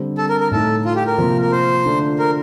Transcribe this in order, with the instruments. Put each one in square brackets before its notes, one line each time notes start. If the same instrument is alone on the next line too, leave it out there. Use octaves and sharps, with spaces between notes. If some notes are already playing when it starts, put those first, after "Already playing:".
Already playing: [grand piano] D3 G3 C4
[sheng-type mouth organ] A4
A#4
A#4
[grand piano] A2 A3 D#4 [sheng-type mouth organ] A4
[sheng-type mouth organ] F4
G4
A#4
[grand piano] C3 F3 A#3 F4
[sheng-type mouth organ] A#4
C5
[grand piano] D3 A3 D4 F4
[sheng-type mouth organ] A#4